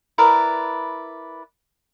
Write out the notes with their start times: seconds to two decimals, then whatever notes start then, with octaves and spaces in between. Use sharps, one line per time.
0.18 E4 A#4 B4 D5